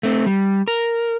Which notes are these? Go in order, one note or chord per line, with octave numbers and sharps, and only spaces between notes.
A3 C4
G3
A#4